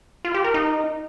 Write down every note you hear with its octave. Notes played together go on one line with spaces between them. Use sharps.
F4
G4
A#4
D#4